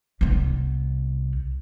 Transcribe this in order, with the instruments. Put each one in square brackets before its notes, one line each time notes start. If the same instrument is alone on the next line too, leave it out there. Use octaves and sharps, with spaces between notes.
[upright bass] C2 B3